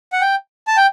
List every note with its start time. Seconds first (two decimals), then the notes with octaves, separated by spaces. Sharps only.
0.13 F#5
0.21 G5
0.67 A5
0.77 G5